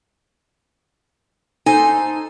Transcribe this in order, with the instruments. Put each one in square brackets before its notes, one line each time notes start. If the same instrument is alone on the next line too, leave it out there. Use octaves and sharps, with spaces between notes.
[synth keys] D#4 A4 C5 [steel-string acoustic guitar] G#5